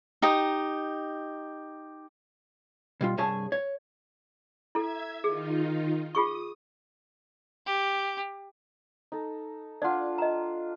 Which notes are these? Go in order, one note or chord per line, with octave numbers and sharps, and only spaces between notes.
D#4 G4 A#5 D#6
B2 G3 F4
C2 G2 G#4 C#5 A5
C#5
E4 A4 E5 G#6
D#3 D#4 F4 G#4
F4 G#4 C#6 D#6
G4
D#4 A4
D4 F4 D5 F#5
D#5 A#5